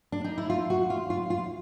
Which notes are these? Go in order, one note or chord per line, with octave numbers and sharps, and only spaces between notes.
D4
D#4
E4
F4
F#4
F4
F4
F4